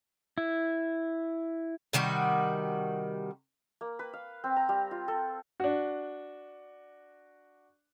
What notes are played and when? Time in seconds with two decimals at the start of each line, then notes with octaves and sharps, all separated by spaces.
0.38 E4
1.93 C3 D#3 G3 F#4
3.81 A#3
3.99 B4
4.13 F5
4.44 C4
4.56 A#5
4.69 G3
4.91 F4
5.08 A4
5.60 D4 F#4